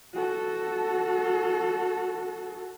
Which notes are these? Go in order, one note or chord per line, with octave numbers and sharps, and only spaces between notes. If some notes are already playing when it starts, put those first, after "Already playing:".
F#4 A4